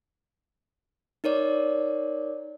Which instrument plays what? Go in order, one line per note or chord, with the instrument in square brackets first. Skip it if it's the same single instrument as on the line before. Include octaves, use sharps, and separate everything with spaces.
[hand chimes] D#4 A#4 C#5 D5